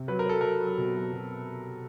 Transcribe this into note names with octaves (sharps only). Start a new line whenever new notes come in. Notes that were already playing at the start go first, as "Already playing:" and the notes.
Already playing: C3
F#3 B4
A#4
F#3 A4
F#3 A#4
F#3
B2
F#3
B2